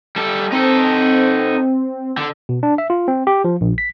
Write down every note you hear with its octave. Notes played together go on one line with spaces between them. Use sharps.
G3 A4
C4 D#4 A4
D3
B2
D4
E5
F4
C4
G4
F3
A#1
B6